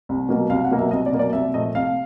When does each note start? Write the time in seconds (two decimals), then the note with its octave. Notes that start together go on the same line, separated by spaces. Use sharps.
0.09 C2
0.29 B2 F#3 A#3
0.50 C2 F5
0.64 F#5
0.71 B2 F#3 A#3
0.78 E5
0.91 C2 D#5
1.06 D5
1.12 B2 F#3 A#3
1.19 D5
1.33 C2 E5
1.54 A#2 F3 A3 D#5
1.74 C2 F5